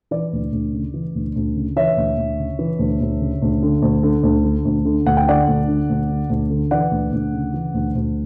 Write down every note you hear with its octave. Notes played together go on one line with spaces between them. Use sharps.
E3 D5
D2
D2
C#3
E3
D2
D2
C#3
E3 C#5 E5
D2
D2
C#3
E3
D2
D2
C#3
D2
D3
D2
D3
D2
D3
D2
D3
D2 F#5
G5
D3 D5 F#5
D2
D3
D2
D3
D2
D3
E3 D5 F#5
D2
D2
C#3
E3
D2
D2